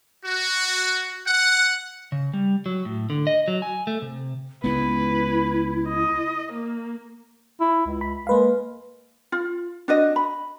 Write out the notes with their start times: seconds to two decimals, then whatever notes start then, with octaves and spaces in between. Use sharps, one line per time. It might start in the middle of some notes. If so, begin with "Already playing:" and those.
0.23 F#4
1.27 F#5
2.12 C#3
2.34 G3
2.66 F#3
2.85 A2
3.10 D3
3.27 D#5
3.48 F#3
3.62 G#5
3.87 A3
4.02 C3
4.64 C#2 G#3 B3 E4 B4
5.88 D#5
6.52 A#3
7.60 E4
7.86 C#2
8.01 B5
8.27 G#3 A#3 B4 F5
9.32 F4
9.88 D4 F#4 D#5
10.16 B5